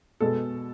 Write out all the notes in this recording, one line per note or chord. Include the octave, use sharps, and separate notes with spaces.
B2 G#3 B3 A4